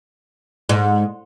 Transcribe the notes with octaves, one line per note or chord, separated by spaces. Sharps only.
G#2